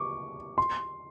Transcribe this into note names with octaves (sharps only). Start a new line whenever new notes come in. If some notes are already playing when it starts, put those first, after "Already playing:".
Already playing: C#6 D6
C6